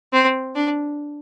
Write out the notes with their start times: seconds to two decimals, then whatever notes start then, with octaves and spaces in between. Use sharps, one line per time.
0.13 C4
0.55 D4